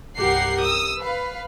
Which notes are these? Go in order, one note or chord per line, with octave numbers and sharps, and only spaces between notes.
C2 G2 G4 A#4 F#5 C7
D#6 E6
B4 F5